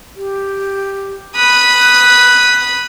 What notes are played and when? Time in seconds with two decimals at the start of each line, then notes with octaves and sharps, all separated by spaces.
0.16 G4
1.36 B5 D#6 F#6